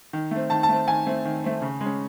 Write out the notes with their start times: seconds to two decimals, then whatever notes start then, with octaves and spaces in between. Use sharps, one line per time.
0.13 D#3
0.31 A3 C4
0.50 D#3 A5
0.63 A5
0.69 A3 C4
0.87 D#3 G#5
1.06 A3 C4
1.25 D#3
1.44 A3 C4
1.62 C#3
1.81 G#3 C#4